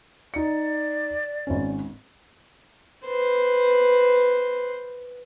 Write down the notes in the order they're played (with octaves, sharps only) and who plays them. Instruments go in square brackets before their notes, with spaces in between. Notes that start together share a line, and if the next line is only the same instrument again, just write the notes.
[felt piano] D#4 C#7 [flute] D5
[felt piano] G#1 C#4
[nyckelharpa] B4 C5